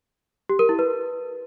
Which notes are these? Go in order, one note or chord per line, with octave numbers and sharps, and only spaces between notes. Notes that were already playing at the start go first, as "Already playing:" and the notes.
G4
A#4
E4
B4